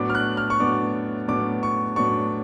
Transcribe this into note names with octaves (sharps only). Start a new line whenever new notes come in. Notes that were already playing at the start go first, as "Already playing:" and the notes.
Already playing: A2 F#3 B3 D4 D6
F6
F#6
F6
C#6
A2 F#3 B3 D4 D6
A2 F#3 B3 D4 D6
C#6
A2 F#3 B3 D4 C#6